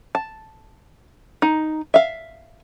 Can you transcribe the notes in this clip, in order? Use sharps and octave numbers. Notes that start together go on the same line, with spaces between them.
A5
D#4
E5 F5